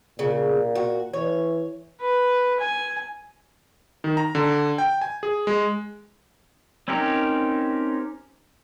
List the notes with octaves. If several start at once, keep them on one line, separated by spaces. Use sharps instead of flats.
A#2 C#3
F#4
E3 C#5
B4
G#5
D#3
A#5
D3
G5
G#5
G#4
G#3
C4 C#4 D#4 G4 A#4